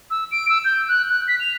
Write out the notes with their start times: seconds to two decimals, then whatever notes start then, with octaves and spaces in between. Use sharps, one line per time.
0.11 E6
0.31 D7
0.49 E6
0.65 G6
0.88 F#6
1.09 F#6
1.28 B6
1.40 F7